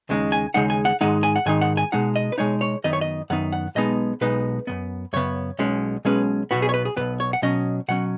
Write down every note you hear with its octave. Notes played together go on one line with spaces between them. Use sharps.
D#2 C#3 G#3 D#4
G#5
D#2 C#3 G#3 D#4 F#5
G#5
F#5
G#2 D#3 G#3 D#4 F#5
G#5
F#5
G#2 D#3 G#3 D#4 G#5
F#5
G#5
B2 G#3 D#4 F#5
D#5
B4
B2 G#3 D#4 C#5
C#5
F#2 D#3 B3 D#4 D#5
C#5
D#5
F#2 D#3 B3 D#4 F#5
F#5
B1 B2 G#3 B3 D#4 D#5
B1 B2 G#3 B3 D#4 B4
F#2 C#3 B3
F#2 C#3 B3 C#5
B1 B2 G#3 C#4
B1 B2 G#3 C#4 B4
B1 B2 B3 F#4
G#4
C#5
B4
G#4
B1 B2 B3 B4
C#5
F#5
B2 F#3 C#4 D#5
B2 F#3 C#4 F#5